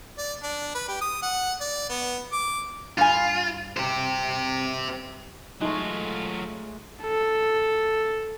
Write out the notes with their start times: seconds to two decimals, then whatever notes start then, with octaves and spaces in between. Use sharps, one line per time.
0.18 D5
0.43 D4
0.75 B4
0.89 G4
1.02 D#6
1.23 F#5
1.61 D5
1.90 B3
2.32 D6
2.98 G2 F4 G#5
3.77 G4 C5
5.61 F#3 G#3 A3 D#4 F4
7.02 A4